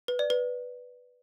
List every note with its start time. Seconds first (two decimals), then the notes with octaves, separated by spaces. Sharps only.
0.08 B4
0.19 D5
0.30 B4